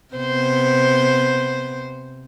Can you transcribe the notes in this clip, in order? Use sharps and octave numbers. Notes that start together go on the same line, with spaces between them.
C3 B3 C5